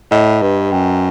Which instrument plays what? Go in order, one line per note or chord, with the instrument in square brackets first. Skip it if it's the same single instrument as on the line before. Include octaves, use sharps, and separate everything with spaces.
[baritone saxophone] A2 [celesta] D#5
[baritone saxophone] G2 [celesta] B4
[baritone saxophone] F#2 [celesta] G5